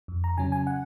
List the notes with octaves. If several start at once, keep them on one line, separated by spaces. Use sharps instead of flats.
F2
A#5
C#3 F#3 C#4 G#5
G#5
F#5